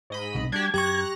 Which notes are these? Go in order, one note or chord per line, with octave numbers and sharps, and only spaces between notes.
G#2 D#5 B5
B1 C3
G3 D4 F#4 G4 G#6
F#2 F#3 G4 A#5 C#6 F#6 A#6